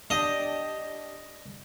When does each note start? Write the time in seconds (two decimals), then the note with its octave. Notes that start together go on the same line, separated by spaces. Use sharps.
0.10 D4 G4 D#5